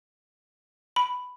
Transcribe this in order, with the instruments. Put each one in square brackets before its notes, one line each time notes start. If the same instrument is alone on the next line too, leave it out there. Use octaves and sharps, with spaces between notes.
[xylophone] B5